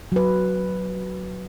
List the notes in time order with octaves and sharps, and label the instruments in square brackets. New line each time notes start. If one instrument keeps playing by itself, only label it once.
[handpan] F#3 B4